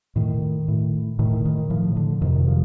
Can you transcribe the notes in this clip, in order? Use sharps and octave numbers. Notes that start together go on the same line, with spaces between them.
A2 D#3
A2
A2 D#3
D#3
A2 F3
D3
F2 C3 D#3
F3